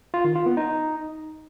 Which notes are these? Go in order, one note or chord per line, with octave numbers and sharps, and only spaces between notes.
F4
D#3
F4
B3
D#4